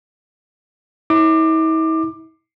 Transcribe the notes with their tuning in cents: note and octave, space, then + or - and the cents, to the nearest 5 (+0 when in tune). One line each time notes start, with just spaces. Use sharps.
E4 -45 D6 +20